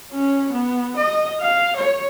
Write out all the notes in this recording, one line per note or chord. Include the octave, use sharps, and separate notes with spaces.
C#4
B3
D#5
F5
C#5